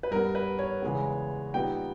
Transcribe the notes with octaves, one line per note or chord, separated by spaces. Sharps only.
B4
G2 G3 B3 A#4
B4
C#5
E2 C#3 G#3 B3
A#2 G3 B3 D#4 G5